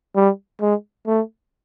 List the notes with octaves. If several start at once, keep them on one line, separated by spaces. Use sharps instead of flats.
G3
G#3
A3